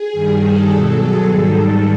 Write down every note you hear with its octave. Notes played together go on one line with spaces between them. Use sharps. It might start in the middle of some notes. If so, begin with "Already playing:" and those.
Already playing: G#4
G2 D#3 G3
A4
B2 F#3
G#4
G#2 D#3 G3 A4
A4